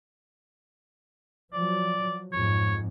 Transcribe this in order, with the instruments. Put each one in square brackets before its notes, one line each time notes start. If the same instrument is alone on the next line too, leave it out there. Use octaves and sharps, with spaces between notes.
[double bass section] F3 F#3 [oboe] D5
[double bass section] F2 G#2 [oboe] C#5